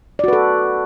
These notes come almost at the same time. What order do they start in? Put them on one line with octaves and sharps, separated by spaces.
D5 F#4 B4 A4